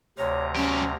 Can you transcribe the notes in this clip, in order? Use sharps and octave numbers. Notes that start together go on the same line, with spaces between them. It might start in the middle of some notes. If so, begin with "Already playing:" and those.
D2 C3 C#5 A#5
F#3 C#4 G4